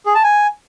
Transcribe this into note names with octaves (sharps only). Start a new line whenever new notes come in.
G#4
A5
G#5